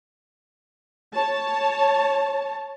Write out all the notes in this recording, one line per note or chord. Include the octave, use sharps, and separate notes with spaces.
C#5 A5